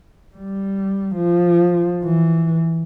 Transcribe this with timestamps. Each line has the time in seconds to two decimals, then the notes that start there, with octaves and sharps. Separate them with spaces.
0.35 G3
1.16 F3
2.04 E3